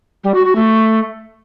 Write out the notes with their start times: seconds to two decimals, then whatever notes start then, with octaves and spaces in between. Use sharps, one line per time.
0.24 G3
0.34 F#4
0.45 F#4
0.55 A3